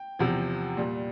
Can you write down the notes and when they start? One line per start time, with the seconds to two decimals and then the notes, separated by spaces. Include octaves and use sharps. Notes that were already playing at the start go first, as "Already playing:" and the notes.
Already playing: G5
0.19 E2 C3 F3
0.77 A#2 G3